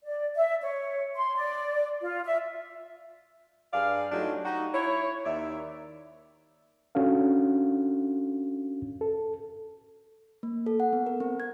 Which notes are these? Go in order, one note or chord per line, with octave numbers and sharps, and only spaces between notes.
D5
E5
C#5
C6
D5
F4
E5
G2 G#4 D5 F5
F#3 A3 D4 D#4 F4 G4
D#4 F#4 G4
E4 C#5
D#2 D#3 D5 E5
C#4 D4 F#4 A4 F5
A4
A#3
A4
F#5
B3
A#4
C4
G#6